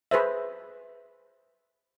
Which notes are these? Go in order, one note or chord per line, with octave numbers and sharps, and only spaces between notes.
G#4 B4 C5 E5